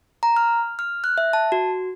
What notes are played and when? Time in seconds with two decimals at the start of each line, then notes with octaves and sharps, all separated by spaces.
0.23 A#5
0.36 F6
0.79 F6
1.04 F#6
1.18 E5
1.33 A5
1.52 F#4